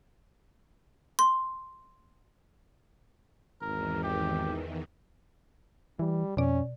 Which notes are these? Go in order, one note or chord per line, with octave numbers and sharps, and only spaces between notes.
C6
G#1 E2 D#3 E3 A#4
G4
E3 G3
F2 B2 C#4 D5